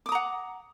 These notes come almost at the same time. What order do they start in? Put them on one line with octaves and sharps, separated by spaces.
D6 D#6 A#5 F#5